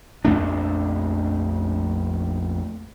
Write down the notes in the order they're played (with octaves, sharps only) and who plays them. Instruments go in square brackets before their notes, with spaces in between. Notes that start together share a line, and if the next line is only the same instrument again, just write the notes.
[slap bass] A#1 F2 A3 D4